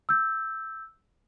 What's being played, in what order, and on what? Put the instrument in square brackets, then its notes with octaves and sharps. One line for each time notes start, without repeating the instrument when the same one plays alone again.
[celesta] E6 G6